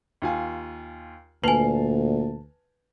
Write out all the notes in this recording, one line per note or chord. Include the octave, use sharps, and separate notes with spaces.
D#2 F4 G#5
D2 A#2 B4 G#5 A5 C7 F7